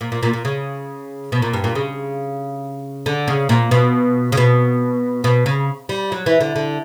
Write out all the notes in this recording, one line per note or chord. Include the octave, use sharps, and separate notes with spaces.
A#2
A#2
A#2
A#2
C#3
B2
A#2
G2
A#2
C#3
D3
C#3
A#2
B2
C#3
B2
B2
C#3
G3
F#3
E3
D3
D3